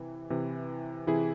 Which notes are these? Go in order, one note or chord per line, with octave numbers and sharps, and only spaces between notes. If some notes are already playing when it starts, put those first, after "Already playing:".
Already playing: C3 E3
C3 E3
C3 E3 E4 G#4